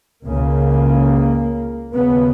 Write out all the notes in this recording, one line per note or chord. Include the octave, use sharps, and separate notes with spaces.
C#2 C#3 A#3
D#2 C#3 B3